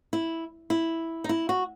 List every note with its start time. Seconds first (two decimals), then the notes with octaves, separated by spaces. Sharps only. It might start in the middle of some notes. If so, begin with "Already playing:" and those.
0.13 E4
0.70 E4
1.24 D#4
1.29 E4
1.49 F#4